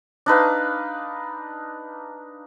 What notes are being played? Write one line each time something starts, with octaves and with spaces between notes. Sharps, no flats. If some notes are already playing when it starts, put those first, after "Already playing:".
D4 D#4 B4 F5